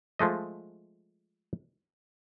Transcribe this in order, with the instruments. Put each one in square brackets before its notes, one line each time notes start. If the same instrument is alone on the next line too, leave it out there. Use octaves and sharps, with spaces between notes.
[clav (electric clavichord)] F3 G#3 A3 D#5